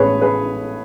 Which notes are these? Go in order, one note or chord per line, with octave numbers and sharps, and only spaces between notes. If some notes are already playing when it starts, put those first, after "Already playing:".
Already playing: A1 A2 G#3 B3 G#4 B4 C#5
G#4 B4